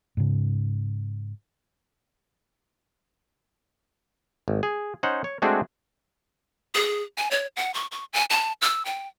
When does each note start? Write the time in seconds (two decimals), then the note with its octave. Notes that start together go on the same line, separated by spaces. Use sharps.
0.17 G#2 C#3
4.48 G#1
4.63 G#4
5.03 C#4 D#4 C5 F#5
5.24 C#5
5.42 G#3 A3 C4 D4 F#4 G#4
6.75 G#4
7.18 G#5
7.31 C#5
7.56 F#5
7.74 C#6
7.91 C#6
8.13 G#5
8.30 A5
8.62 E6
8.85 G5